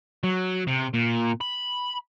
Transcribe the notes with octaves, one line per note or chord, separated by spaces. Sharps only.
F#3
C3
A#2
B5